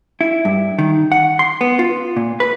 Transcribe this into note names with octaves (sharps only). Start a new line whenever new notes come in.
E4
G2
D#3
F#5
C6
B3
F4
A#2
B4